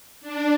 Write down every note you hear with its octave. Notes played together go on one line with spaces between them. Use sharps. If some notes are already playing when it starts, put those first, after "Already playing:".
D4